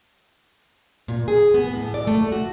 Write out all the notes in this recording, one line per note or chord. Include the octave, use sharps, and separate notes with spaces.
A#2
G#4
B3
A2
D5
A3
F#4